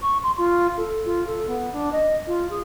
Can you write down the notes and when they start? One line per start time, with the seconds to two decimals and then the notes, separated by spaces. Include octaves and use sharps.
0.02 C#6
0.23 C6
0.38 F4
0.77 A4
1.06 F4
1.27 A4
1.47 B3
1.73 D4
1.92 D#5
2.27 F4
2.50 G#4